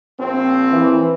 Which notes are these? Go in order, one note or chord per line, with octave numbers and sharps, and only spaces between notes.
A#1 C4
E3